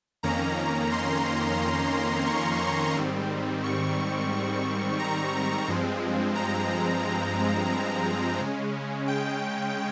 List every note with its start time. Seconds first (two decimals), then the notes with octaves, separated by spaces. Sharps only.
0.23 F2 D#3 A#3 C#4 A#5
0.92 C6
2.27 C#6
2.96 G#2 D#3 G3 C4
3.64 C#6
4.99 A#5
5.68 G2 F3 G#3 C4
6.35 A#5
7.72 A#5
8.40 C#3 G#3 C#4
9.08 G5